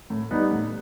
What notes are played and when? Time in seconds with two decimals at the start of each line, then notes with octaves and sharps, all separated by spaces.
0.10 A2
0.31 G3 B3 D#4
0.51 A2